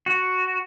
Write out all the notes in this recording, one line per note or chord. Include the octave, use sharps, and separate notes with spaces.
F#4